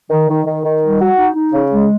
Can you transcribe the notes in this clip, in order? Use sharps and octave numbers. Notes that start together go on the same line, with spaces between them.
D#3
D#3
D#3
D#3
G3
F#4
D#4
D#4
C#3
G#3